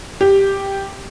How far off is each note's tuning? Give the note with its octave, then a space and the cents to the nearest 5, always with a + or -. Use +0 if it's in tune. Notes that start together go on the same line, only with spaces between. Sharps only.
G4 +0